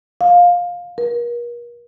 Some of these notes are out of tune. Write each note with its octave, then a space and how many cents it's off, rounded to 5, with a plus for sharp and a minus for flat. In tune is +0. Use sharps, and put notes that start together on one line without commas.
F5 +15
A#4 +40